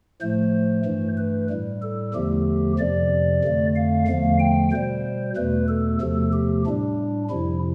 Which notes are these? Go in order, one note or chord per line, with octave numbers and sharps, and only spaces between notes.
A2 F3 A3 C5
G2 E3 A3
B4
A2 G3
A4
E2 D3 F3 A3 G4
F2 C3 F3 D5
F2 D3 A3
F5
E2 D3 F3 A3 F5
G5
B2 G3 C5
E2 B2 A3 B4
A4
E2 C3 F3 A3 A4
G4
A2 G3 D4
F2 C3 F3 E4